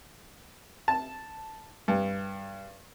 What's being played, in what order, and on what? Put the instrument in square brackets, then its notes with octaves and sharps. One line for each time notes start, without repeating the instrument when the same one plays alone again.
[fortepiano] A5
G2